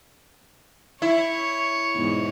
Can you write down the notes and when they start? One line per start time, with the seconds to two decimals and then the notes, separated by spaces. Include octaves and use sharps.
1.02 E4 C#5
1.96 E2 G#2 B2